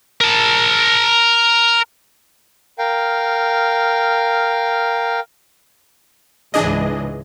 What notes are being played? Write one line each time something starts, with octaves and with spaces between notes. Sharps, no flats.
A#4 A5
A#4 F5 G5
C#2 G#2 E3 D4 G#4 D#5